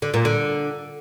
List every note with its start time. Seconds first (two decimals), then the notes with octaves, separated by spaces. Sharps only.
0.02 D3
0.14 A#2
0.25 D3